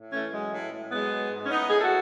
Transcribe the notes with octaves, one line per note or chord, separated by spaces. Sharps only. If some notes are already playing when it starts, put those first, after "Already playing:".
Already playing: A2
E3 A3 C#4
F#3 G#3
A2
A2
F#3 G#3 B3
F#3
G#2
C#4
A2 B3 D#4
A2 G#4
F#4 A4